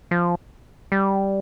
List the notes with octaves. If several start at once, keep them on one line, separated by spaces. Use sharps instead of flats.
F3
G3